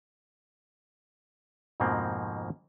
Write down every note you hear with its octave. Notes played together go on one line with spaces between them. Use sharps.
F2 G#2 B2 F3 A#3 C4